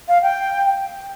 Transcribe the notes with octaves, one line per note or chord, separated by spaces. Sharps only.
F5
G5